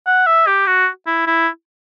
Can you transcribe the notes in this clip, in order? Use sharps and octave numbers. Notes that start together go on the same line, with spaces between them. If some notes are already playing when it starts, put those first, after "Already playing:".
F#5
E5
G4
F#4
E4
E4